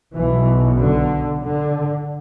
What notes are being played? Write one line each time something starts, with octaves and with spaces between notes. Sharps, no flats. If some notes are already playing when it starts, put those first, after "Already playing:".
B1 B2 E3
D3
D3